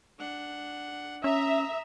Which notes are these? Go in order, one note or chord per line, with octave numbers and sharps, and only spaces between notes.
D4 F#5
C#4 E5 A#5 D#6